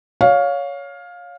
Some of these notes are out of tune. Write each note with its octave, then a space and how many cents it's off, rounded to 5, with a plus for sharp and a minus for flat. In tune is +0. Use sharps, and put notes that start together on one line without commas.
C#5 +15 F5 +15